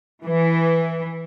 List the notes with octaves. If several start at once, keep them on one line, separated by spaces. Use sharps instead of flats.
E3